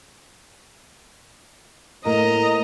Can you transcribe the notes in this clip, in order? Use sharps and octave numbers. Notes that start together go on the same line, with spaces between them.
A2 A#3 D#5 A#5